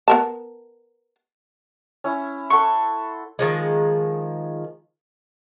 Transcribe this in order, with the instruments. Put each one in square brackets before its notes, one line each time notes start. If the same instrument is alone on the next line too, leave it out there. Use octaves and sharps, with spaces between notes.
[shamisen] B3 A#4 A5
[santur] C#4 E4
[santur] A4 F#5 C6 [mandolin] C#6
[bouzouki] D#3 F3 G#3